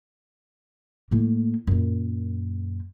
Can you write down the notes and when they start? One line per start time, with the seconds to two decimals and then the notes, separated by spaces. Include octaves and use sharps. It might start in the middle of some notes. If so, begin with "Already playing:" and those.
1.11 A2 A#3
1.67 F#2 A#2